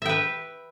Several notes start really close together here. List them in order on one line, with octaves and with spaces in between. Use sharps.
E5 G5 B4